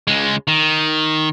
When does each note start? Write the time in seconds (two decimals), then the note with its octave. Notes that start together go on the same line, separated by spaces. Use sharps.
0.07 C#2 G#3
0.48 D#3